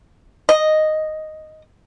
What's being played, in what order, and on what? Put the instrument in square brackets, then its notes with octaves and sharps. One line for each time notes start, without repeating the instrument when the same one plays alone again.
[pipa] D#5